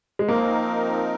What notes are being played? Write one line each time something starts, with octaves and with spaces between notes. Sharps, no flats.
G#3
F3 A#3 C4 D#4 A#4